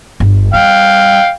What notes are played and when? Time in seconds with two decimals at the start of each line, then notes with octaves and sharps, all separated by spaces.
0.20 G1
0.54 G3 F5 G5